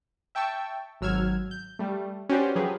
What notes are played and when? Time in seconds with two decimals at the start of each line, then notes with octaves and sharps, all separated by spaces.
0.35 E5 G5 A5 C#6 E6
1.01 G#1 F#3 E6 F6 G#6
1.51 G6
1.79 G3 A3
2.29 C#4 F#4 G4 B4 C5 D5
2.55 F3 F#3 C#4 G4 G#4 B4